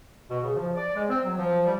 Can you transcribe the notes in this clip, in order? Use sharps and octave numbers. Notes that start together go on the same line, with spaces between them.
B2
C#3
F3
D5
G#3
C4
F#3
F3
G3